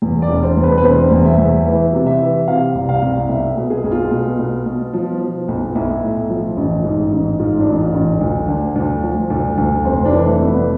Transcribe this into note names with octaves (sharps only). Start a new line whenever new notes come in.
E2
D5
E1
C5
E2
B4
B4
E1 C5
E2
E5
E2
E3 E5
C3
E5
E3
C3 F5
C2
F5
C2
B1 E5
B2
G#4
B1
F4
B2
B2
B2
F3
F3
B1
B1 E4
A2
F3
A1
G#2
A1
G#2 F4
D4
A1
F4
A1
D2
D3
D2
F3
D2
D2
F1 C5
D4
E3
A3
F1
B3